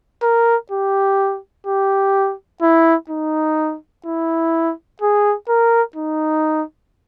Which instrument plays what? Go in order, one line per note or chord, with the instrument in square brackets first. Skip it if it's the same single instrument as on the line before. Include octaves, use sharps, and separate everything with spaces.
[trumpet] A#4
G4
G4
E4
D#4
E4
G#4
A#4
D#4